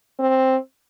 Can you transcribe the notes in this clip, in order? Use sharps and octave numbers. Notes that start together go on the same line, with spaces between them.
C4